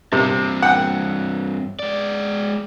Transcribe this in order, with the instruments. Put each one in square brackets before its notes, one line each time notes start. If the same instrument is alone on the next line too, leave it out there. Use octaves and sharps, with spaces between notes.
[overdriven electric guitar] G2 C4 [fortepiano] C3
[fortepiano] F#5 G5
[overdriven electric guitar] G#3 D5